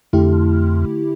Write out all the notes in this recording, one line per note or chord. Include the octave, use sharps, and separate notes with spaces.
F2 D3 A3 E4 G4